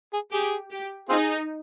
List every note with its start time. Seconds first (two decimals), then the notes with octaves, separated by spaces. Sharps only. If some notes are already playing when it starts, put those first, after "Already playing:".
0.13 G#4
0.32 G4 G#4
0.71 G4
1.09 C4 D#4 F4 G#4